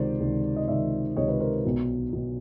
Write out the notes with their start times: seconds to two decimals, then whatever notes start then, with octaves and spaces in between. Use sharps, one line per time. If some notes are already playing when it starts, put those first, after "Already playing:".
Already playing: C#2 C3 D#3 C5 D5
0.20 C#2 C3 D#3
0.56 D#5
0.68 C#2 C3 D#3 D5 E5
1.16 C#2 C3 D#3 C#5 D#5
1.28 B4 C#5
1.40 A#4 C5
1.64 B1 B2
2.13 B1 B2